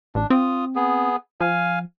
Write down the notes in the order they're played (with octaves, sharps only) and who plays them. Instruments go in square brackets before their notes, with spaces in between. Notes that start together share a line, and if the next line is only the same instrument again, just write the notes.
[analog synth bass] A1 [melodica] D4
[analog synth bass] C4 [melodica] F4 D#6
[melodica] B3 G#4
[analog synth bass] F3 [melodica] F5 G#5